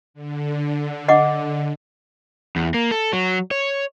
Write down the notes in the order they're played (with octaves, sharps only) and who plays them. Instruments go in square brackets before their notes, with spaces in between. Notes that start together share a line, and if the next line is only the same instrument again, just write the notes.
[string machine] D3
[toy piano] D#5 F#5 D6
[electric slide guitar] E2
A#3
A4
F#3
C#5